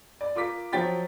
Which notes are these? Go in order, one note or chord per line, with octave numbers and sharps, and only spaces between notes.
D5
F4 A#4 D6 B6
F3 F#3 C#5 G5 A6 B6